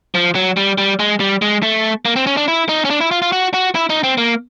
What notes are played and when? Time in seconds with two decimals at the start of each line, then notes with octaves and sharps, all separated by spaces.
0.15 F3
0.35 F#3
0.57 G3
0.78 G3
0.99 G#3
1.20 G3
1.42 G#3
1.63 A3
2.05 A#3
2.16 C4
2.27 C#4
2.37 D4
2.48 E4
2.69 D#4
2.85 C#4
2.90 D4
3.01 E4
3.11 F4
3.22 F4
3.32 F#4
3.54 F#4
3.75 E4
3.90 D#4
4.03 C4
4.18 A#3